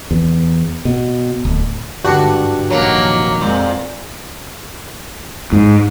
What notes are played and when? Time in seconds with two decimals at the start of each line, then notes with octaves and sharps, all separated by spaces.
0.11 E2
0.85 B2
1.45 D1
2.05 G#1 G2 D3 D4 F#4
2.70 F1 A#1 D#3 F#3 A#3
3.41 F2 A#2 G#3 C4
5.53 G#2